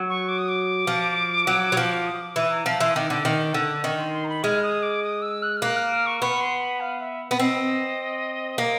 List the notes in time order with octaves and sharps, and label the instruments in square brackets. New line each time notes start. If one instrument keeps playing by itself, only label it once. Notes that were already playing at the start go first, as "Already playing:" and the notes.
Already playing: [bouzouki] F#3
[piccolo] C#6
D6
D#6
D6
[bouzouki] F3
F#3
F#3
F3
[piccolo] D#6
D6
[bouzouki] E3 [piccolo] B5
[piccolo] A#5
[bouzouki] F3 [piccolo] A5
[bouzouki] E3 [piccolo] C6
[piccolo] D#6
[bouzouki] D#3 [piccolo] D6
[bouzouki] D3 [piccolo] D6
[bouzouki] D#3
D3
[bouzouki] D#3 [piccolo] C#6
[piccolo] C6
C6
A#5
B5
[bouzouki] G#3 [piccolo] F6
[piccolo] D#6
D6
D#6
E6
F#6
F6
[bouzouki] A#3 [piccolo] F#6
[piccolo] F6
F6
C#6
[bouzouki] B3 [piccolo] C#6
[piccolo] C6
B5
F5
E5
[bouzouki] B3
[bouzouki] C4 [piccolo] D#5
[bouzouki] A#3